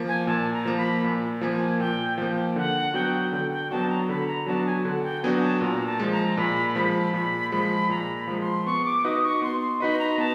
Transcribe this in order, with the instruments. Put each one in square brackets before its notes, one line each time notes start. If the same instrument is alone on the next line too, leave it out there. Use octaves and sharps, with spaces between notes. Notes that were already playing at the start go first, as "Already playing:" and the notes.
Already playing: [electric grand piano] F3 A#3
[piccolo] G#5
[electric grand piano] A#2 [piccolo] A5
[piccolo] A#5
[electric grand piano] F3 A#3
[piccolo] B5
[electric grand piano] A#2
[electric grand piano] F3 A#3 [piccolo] G#5
[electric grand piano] A#2 [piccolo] G5
[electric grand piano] F3 A#3 [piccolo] G5
[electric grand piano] D3 [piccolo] F#5
[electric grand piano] F#3 B3 D4 F#4 [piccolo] G5
[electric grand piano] D3 [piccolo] G5
[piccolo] G5
[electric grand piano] F#3 B3 D4 F#4 [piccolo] A5
[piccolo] A#5
[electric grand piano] D3 [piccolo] B5
[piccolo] A#5
[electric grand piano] F#3 B3 D4 F#4 [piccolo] A5
[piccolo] G#5
[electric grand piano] D3 [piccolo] F#5
[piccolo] F#5
G5
[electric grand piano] F#3 B3 D4 F#4 [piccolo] G#5
[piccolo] A5
[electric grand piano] A#2 [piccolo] A#5
[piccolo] A5
[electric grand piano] F3 G#3
[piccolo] A#5
[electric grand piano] A#2 [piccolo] B5
[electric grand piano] F3 G#3 [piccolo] B5
[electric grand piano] A#2 [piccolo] B5
[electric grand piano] F3 G#3 [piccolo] B5
[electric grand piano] A#2 [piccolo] A#5
[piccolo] B5
[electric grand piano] F3 G#3
[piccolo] C6
[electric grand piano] B3 [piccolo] C#6
[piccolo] D6
[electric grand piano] D#4 F#4 B4 D#5 [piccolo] D#6
[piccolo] C#6
[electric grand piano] B3 [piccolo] C6
[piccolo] C6
[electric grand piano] D#4 F#4 B4 D#5 [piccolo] B5
[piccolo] A#5
[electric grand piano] B3 [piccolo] A5